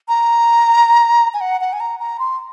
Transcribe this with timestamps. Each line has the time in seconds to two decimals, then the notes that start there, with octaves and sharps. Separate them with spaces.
0.08 A#5
1.34 G#5
1.41 F#5
1.61 F#5
1.73 G#5
1.80 A#5
2.00 A#5
2.19 C6